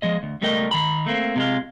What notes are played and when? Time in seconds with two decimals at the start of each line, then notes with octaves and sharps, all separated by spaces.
0.02 F3 G#3 D#5
0.23 D2
0.41 C#2 G3 A3 A#4 D#5 G5
0.71 D#3 A#5 B5
1.06 A3 A#3 C4
1.36 C3 G#3 F4